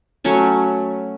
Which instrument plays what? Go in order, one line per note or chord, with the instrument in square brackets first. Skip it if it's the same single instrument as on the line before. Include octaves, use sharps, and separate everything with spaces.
[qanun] F#3 A3 C#4 C#5